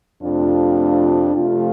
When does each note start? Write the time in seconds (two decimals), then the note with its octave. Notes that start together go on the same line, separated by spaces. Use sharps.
0.22 F2 C3 A3 D4 F4
1.34 C3 F3 A3 F4